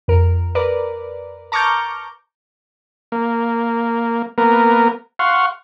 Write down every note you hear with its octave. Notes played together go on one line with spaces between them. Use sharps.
F2 A#4
A#4 B4 D5
A5 A#5 C#6 D6 F6 G6
A#3
A#3 B3 A#4
F5 F#5 C6 C#6